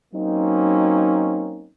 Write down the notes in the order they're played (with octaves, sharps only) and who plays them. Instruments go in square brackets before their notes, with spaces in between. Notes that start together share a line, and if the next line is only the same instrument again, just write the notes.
[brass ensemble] F#3 A#3 C4 C#4 D#4